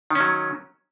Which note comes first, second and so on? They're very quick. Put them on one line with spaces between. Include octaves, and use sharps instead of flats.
D#3 C#4 F#3